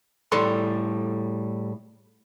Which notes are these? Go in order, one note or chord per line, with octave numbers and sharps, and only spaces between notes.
A2 G3 A4 C6